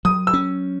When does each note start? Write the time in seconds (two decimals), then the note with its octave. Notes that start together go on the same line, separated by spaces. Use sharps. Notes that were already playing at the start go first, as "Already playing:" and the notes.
0.05 F#3 D#6
0.27 E6
0.34 C#4